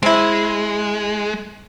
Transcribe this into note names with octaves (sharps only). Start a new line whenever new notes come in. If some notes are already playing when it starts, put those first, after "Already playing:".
G#3 C4 E4